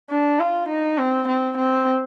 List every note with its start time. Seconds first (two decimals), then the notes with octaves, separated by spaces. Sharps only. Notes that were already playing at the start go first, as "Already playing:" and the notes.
0.10 D4
0.39 F4
0.69 D#4
0.98 C4
1.28 C4
1.58 C4